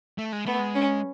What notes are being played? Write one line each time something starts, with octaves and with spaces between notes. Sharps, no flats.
A3
G#3
A3 B3
G#3
C#4